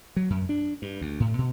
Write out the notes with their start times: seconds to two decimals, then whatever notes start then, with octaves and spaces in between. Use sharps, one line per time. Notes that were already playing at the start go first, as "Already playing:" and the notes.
0.16 F#3
0.30 F#2
0.49 D4
0.82 G2
1.01 D2
1.20 A2
1.38 B2